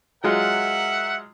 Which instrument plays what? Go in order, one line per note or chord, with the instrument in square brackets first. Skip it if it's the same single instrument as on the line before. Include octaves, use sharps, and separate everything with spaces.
[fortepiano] F#3 G#3 F4 [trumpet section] A#4 E5 F#5